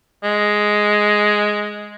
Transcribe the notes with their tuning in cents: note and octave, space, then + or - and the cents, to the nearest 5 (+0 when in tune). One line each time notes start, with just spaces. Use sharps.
G#3 +5